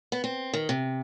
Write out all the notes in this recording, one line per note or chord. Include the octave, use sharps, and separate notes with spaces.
B3
C4
D#3
C3